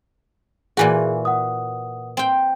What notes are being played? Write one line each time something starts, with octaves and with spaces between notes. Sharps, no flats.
A#2 E3 F#4 G#4 G#5
F#5 D#6
C4 G5